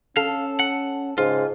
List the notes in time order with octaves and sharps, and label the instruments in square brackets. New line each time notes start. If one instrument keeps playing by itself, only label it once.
[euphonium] C#4 [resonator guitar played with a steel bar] A4 [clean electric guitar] F5
[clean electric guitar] F#5
[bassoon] G#2 [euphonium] C#3 [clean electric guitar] F4